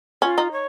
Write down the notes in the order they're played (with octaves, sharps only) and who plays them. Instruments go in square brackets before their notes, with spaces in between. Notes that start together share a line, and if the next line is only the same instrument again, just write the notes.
[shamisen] C#4 [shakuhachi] F4
[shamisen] D#4
[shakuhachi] C#5